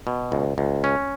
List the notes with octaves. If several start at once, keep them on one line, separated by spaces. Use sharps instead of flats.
B2
C#2
C#2
C#4